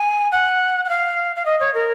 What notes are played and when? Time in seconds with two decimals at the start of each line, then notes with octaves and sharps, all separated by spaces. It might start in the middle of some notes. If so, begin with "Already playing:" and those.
Already playing: G#5
0.32 F#5
0.85 F#5
0.89 F5
1.36 F5
1.45 D#5
1.60 C#5
1.74 A#4